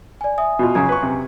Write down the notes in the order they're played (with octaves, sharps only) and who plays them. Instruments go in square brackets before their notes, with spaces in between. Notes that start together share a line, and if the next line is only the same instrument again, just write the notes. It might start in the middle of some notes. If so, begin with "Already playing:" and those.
[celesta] D5 G#5
E5 G#5 D#6
[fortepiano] B2 F4
[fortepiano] F#2 C#3 [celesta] G#5 A#5 G#6
[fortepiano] B4 C#6
C3